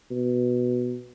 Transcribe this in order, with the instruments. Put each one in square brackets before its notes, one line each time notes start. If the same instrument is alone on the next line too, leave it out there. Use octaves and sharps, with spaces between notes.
[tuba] B2